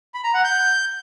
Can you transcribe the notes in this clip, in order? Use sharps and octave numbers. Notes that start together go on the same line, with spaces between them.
B5
A#5
F#5
G6